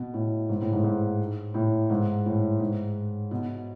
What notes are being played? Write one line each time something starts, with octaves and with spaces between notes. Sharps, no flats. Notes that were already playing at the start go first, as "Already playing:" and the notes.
Already playing: B2
A2
G#2
A2
G#2
G#2
A2
G#2
A2
G#2
B2